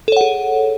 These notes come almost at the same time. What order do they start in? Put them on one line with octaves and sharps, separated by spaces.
A4 C#5 F#5 G#4